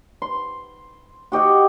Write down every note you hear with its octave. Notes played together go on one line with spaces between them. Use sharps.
C6
F#4 G4 D#5 F#5